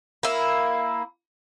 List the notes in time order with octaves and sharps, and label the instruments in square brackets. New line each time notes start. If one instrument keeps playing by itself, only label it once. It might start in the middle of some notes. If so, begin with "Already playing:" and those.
[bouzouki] A#3 E4